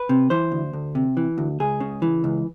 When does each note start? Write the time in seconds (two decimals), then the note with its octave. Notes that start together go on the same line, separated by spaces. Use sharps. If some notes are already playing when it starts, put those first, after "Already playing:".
Already playing: B4
0.09 C3
0.30 E3 C5
0.52 D2
0.73 D2
0.95 C3
1.17 E3
1.38 D2
1.60 C#2 G#4
1.80 C#3
2.02 E3
2.24 C#2